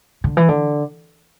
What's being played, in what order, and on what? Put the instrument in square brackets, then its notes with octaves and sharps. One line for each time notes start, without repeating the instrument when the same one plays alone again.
[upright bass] D3
E3
D3